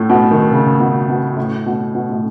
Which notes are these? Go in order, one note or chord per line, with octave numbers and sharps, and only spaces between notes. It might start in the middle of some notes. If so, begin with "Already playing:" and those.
Already playing: A2
B2
D#3
C#3
B2
B2
A2
B2
B2
A2